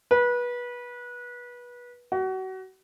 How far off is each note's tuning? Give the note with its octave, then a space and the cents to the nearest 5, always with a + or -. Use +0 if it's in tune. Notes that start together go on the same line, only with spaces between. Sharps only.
B4 -25
F#4 +30